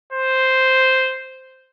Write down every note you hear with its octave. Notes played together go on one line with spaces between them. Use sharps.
C5